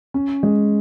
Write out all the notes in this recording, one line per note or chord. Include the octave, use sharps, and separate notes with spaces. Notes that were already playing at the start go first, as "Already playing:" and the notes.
C#4
G#3